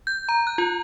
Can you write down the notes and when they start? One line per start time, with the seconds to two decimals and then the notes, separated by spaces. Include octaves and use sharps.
0.07 G6
0.29 A#5
0.47 F#6
0.58 F4